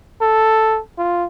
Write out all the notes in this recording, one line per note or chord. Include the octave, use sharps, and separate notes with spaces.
A4
F4